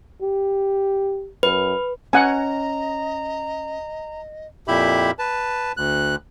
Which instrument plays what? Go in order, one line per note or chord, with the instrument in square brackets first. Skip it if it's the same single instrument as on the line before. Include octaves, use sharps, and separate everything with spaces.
[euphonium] G4
[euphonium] F#2 [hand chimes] B4
[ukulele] C#4 [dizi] D#5 [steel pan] F#5 G#5 [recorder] A#5
[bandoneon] F2 A#2 E4 G4 E5 B5
B4 A5
D2 F#6